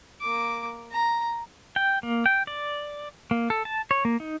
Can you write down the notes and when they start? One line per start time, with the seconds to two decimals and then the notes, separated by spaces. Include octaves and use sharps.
0.21 A#3 D6
0.92 A#5
1.76 G5
2.03 A#3
2.26 G5
2.47 D5
3.31 A#3
3.50 A4
3.65 A5
3.91 C#5
4.05 A#3
4.20 D#4